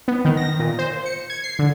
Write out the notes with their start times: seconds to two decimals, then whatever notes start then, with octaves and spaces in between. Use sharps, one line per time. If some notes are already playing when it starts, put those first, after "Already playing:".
0.08 B3
0.25 D#3
0.37 A#6
0.59 A#2
0.79 C5
1.06 C#7
1.30 G#6
1.44 C7
1.59 D3